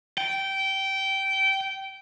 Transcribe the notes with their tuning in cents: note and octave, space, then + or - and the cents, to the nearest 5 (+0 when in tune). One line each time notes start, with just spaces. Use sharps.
G5 -15